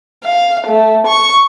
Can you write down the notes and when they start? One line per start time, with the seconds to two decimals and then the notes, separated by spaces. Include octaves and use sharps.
0.24 F5
0.67 A3
1.07 C#6